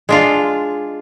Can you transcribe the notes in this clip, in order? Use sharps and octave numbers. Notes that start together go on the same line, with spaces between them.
G#3 D4 F4